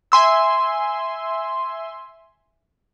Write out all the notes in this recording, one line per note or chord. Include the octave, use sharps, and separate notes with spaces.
E5 G#5 C6 E6